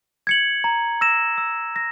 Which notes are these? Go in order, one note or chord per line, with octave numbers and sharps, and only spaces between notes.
G#6 C#7 F#7
A#5
E6 A#6 E7
E6
A#6